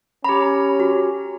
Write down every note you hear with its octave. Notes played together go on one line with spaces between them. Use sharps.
C#4 G4 A#5 B5
F#4